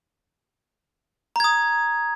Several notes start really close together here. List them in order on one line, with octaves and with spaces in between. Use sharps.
A#5 G#6 D#6